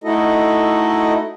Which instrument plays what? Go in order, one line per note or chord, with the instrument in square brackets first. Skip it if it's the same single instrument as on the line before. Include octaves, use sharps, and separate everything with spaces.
[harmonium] A3 D#4 E4 F#4 A4 D#5